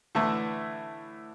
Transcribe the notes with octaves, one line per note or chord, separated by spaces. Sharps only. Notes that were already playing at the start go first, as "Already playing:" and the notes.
A2 D3 E3 A3 E4